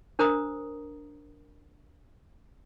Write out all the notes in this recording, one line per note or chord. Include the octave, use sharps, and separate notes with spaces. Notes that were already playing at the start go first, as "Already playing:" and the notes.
D4 A#4 C5 A#5 D#6